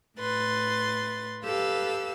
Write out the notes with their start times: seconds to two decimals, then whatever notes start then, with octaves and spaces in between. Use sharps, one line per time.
0.17 A2 B4 C6 A6
1.43 G4 A4 B4 F5 E6